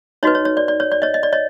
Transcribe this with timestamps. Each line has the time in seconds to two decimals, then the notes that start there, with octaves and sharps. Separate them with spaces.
0.23 D#4 F#4 B4 C#5 D#5
0.35 C#5
0.45 C#5
0.57 D5
0.68 D5
0.80 C#5
0.92 D5
1.02 C#5 D#5
1.14 D#5
1.23 D5
1.33 C#5 D#5